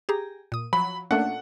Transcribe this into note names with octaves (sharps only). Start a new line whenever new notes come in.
G4 G#4 A#5
A#2 D#6
F3 F#3 B5
A#2 A3 C#4 D4 F#5